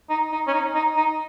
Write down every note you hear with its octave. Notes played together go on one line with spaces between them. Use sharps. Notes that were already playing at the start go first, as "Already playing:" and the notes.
D#4
D#4
C#4
D#4
D#4
D#4